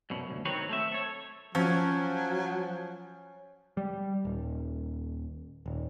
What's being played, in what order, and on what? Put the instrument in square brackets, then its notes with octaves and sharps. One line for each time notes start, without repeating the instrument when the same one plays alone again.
[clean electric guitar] C2 F#2 B2
D2
D#3 F#3 C4 B4 C#5
A3 C4 E5
A4 C#5
[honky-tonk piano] F3 [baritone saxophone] F#3 [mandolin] C#4
[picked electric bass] G3
D#1
D#1